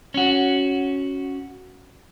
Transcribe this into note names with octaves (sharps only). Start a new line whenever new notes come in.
C#4 F#4